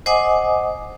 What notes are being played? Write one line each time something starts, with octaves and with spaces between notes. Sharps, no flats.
C5 D#5 F#5 G#5 D6 D#6